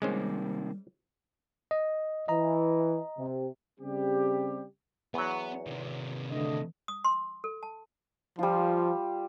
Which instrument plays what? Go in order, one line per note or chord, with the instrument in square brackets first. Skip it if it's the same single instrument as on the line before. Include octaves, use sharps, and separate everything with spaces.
[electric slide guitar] C3 D#3 A#3 [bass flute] G3 [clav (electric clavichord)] G#3 C#4 C5
[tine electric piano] D#5
[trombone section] E3 [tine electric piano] D#5 A#5
[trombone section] C3
[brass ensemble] C#3 G3 C4 G4
[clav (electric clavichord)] E2 F#3 [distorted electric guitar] B3
[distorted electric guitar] C3 D#3
[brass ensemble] D3 A3 D#5
[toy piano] D#6
C6
A4
A5
[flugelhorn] F3 [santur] G3 F4